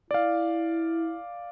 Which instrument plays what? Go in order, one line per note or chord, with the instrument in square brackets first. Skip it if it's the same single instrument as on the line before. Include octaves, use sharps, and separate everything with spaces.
[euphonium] E4 [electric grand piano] D5 F5